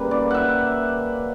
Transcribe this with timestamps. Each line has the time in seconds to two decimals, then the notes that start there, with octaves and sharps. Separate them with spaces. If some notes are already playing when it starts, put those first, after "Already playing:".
Already playing: C#3 G3 A#3 B4
0.11 D5
0.31 E5 F#5